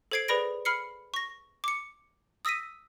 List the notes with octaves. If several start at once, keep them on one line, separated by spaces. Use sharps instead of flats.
A4 C5 G#6 C7 D7
G#4 B4 D5 B5 A#6 D7
B5 F6 C7 C#7
C#6 A#6
D6 C#7
D#6 E6 A#6 B6 D#7